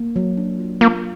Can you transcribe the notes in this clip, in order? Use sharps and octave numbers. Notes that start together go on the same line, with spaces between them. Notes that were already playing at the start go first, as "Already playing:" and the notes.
Already playing: A#3
F#3
D4
F4
A#3 F4